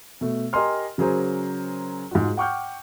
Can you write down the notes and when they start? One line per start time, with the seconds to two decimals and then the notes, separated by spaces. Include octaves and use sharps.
0.21 B2 A3
0.53 G4 A#4 D#5 G#5 C6 F6
0.98 C#3 F#3 G#4 A#4 C5
2.11 G#2 F4 F#4
2.37 F#5 G5 C#6 D6 F6 G6